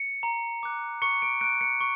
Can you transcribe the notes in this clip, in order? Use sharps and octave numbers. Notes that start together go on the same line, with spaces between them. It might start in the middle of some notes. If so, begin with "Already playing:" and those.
Already playing: C#7
A#5
D6 F#6
C#6 C#7
D7
F#6 D7
C#7
C#6